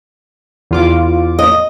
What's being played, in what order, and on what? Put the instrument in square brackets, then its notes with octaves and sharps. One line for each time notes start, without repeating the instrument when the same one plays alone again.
[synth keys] E2 F4 D6
[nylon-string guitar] D#5